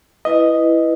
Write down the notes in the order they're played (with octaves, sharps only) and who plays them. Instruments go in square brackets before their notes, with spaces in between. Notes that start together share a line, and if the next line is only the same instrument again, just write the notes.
[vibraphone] E4 B4 [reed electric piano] D#5